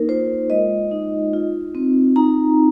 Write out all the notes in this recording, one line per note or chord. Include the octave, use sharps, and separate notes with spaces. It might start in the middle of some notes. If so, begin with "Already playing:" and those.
Already playing: A#3 D#4 A#4
F4 C5
G#3 D#5
D#4
F4
C4
D#4 A#5